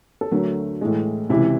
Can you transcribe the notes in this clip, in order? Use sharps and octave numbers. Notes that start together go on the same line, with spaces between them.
A4
D2 D3 F#3 A3 A#4
A2 E3 G#3
C#2 C3 E3 E4